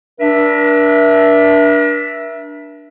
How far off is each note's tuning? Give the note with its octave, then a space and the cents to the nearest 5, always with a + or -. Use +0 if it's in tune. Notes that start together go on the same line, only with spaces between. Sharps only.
D4 +0 A#4 +45 E5 +0